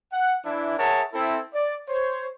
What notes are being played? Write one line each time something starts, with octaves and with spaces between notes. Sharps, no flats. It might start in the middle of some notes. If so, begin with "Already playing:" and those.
F#5
E3 D4 E4
G#4 A#4 C#5 E5 F#5 A5
C4 E4 A4
D5
C5 C#5